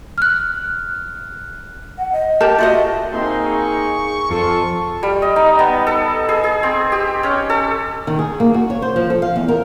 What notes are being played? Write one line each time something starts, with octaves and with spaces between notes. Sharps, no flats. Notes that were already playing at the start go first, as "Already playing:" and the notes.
F6 F#6
F#5
D#5
G4 A#4 A5
F4 F#4 D#5 E5
A#3 C4 D#4 G#4 C6
C#6
F2 F4 A4 A5 C#6
G3
D#5
D#4
B3
A4
G#4
G#4
C4
G4
C#4
A4
D#3
G#4
A#3
F#4
C#5
C5
F3
A4
F5
E2
A#4